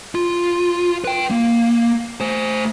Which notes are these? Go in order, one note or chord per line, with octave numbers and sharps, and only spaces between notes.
F4
B4 G5
A#3
A3 C5